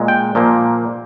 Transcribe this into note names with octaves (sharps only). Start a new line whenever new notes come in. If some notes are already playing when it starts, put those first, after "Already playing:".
Already playing: A#2 G#3
G5
A#2 F3 A#3